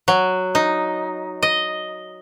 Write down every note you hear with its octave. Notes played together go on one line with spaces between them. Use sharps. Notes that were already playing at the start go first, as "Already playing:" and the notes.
F#3
D#4
D#5